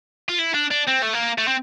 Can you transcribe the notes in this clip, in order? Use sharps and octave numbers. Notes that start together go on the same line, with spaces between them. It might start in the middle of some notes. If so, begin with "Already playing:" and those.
F4
E4
D4
D4
C4
A3
A#3
A3
C4